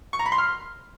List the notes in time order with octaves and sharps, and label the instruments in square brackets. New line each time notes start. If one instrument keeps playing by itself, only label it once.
[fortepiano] C#6
A#5
B5
C6
F6